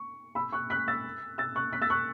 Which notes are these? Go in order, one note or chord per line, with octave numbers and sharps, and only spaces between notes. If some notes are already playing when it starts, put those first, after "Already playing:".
Already playing: C#6
B5 E6
C#6 F#6
F#6 B6
E6 A6
E6 A6
C#6 F#6
F#6 B6
E6 A6
C#6 F#6